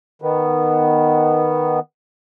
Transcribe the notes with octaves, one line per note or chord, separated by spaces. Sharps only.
D#3 B3